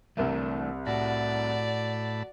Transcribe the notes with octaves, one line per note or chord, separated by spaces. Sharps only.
C2 E3 A3 D4 A#4 E5
A2 F#4 D5 A5 B5